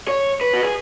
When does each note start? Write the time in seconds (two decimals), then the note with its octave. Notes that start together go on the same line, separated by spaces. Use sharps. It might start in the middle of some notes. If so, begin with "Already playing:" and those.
0.08 C#5
0.41 B4
0.53 F#4
0.63 G#4